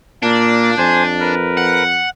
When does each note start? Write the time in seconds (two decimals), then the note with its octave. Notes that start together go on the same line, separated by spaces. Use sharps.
0.23 A#2 A#3 D4
0.78 F2 C5 G#5
1.20 A#4 B4
1.58 F#5